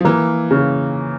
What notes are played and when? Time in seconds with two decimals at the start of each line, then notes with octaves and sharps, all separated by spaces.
0.01 F3
0.05 E3 A#3
0.51 C#3